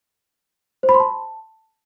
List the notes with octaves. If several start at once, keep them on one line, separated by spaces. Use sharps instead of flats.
C5
B5
C6
A5